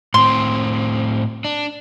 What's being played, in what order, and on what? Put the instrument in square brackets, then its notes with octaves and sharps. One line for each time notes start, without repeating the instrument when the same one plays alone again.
[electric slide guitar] A2 C4 [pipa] C6
[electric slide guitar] D4